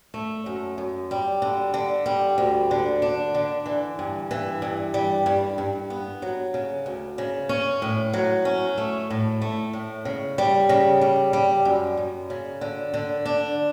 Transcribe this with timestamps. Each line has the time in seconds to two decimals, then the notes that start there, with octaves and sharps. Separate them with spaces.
0.14 A3
0.46 F#2
0.78 F#2
1.11 G3
1.42 D3
1.74 D3
2.06 G3
2.38 D2
2.71 D3
3.02 D4
3.34 D3
3.66 E3
3.99 G2
4.31 E3
4.62 G2
4.94 G3
5.26 G2
5.58 G2
5.90 B3
6.22 F#3
6.54 C#3
6.86 D2
7.18 C#3
7.49 C#4
7.82 A2
8.13 F#3
8.45 C#4
8.78 A3
9.10 A2
9.42 A3
9.73 A2
10.05 C#3
10.38 G3
10.69 C#3
11.01 G3
11.33 G3
11.65 F#2
11.97 F#2
12.30 C#3
12.61 D3
12.94 D3
13.26 D4